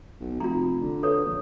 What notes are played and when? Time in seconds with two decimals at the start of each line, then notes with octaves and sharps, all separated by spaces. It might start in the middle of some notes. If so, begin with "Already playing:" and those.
0.21 B1
0.40 F1 F4 A#5
0.81 D3
1.03 A4 B4 C#5
1.25 A#1